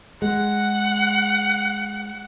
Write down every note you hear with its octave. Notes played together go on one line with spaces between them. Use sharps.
G#3 F#5